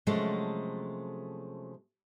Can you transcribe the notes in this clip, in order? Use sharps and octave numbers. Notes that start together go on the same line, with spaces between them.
C3 F3 F#3 G#3 A3 C#4